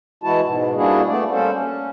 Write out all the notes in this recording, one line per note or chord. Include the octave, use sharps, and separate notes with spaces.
E3 G#3 E4 F#4 A5
G#2 B2
G3 A#3 D4 E4 F#4 G#4
A3 B3 D5
G3 A#3 C#4 A4 C5
C#4